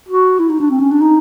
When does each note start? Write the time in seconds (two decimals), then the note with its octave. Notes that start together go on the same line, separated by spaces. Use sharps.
0.09 F#4
0.40 E4
0.50 D#4
0.60 D4
0.71 C4
0.81 C#4
0.91 D4
1.01 D#4